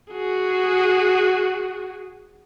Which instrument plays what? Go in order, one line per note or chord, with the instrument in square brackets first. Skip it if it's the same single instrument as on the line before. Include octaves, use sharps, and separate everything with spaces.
[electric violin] F#4 G#4